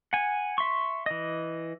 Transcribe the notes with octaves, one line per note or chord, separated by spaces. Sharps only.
F#5 G#5
E5 C6 C#6
E3 D#5